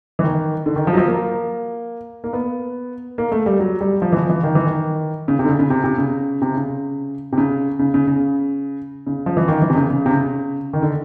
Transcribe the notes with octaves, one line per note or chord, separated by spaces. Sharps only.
E3
D#3
D3
D#3
F3
F#3
F3
A#3
A#3
B3
A#3
A3
G3
F#3
G3
F3
E3
F3
E3
D#3
E3
D#3
C#3
C3
D3
C#3
C#3
C3
C3
C#3
C3
C#3
C3
C#3
C#3
C#3
C#3
C#3
F3
E3
D#3
E3
C3
C#3
C#3
C3
C#3
D#3
D3